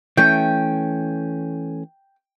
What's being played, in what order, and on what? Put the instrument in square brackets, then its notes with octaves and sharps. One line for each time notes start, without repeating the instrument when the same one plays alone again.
[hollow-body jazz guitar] E3 A3 C#4 [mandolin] G5